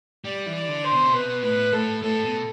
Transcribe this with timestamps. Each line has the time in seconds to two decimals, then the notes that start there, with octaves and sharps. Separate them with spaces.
0.24 G3 D5
0.46 E3
0.54 D5
0.68 D3
0.84 C5
0.92 B2
1.05 C3
1.13 B2 B4
1.42 A2 B4
1.72 A2 A4
2.02 A2 A4
2.24 B2